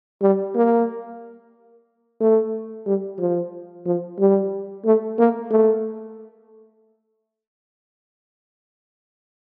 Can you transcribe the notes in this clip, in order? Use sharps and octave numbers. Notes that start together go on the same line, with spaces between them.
G3
A#3
A3
G3
F3
F3
G3
A3
A#3
A3